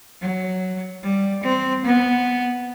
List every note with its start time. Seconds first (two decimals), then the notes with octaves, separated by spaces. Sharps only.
0.21 F#3
1.03 G3
1.44 C4
1.85 B3